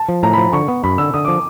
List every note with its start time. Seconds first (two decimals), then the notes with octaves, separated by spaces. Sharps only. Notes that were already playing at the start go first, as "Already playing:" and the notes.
Already playing: A5
0.09 F3
0.23 A2 A#5
0.33 F3 B5
0.53 D3 C#6
0.68 B3
0.84 F#2 B5
0.98 D3 E6
1.14 D3 D#6
1.25 F3 D6